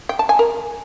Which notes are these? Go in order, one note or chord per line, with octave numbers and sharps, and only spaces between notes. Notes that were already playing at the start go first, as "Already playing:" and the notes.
G5
A5
G#5
A#4